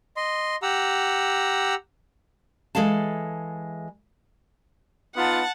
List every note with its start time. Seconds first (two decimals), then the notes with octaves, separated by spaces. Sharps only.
0.17 D#5 C6
0.62 G4 F#5 A#5 E6
2.75 E3 G#3 A4 F5 A5
5.15 B3 D#4 F4 F#5 A5